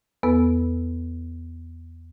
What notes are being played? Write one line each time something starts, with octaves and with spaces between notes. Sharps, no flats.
E2 B3 A4 B4 E6